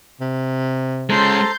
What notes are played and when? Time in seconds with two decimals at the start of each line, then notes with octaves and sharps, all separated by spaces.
0.21 C3
1.10 G#3 C#4 A4 C5 A#5 C6 G6 A6